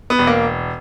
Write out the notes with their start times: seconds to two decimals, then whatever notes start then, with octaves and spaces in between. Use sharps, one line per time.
0.10 B3
0.19 E1
0.27 A#3